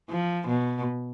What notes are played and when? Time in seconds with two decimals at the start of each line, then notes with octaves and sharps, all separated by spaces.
0.10 F3
0.48 B2